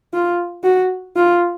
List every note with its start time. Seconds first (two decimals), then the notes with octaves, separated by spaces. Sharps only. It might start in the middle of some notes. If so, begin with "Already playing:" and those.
0.13 F4
0.64 F#4
1.16 F4